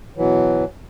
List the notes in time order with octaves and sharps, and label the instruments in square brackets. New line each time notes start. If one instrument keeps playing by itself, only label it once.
[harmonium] B2 E3 F#3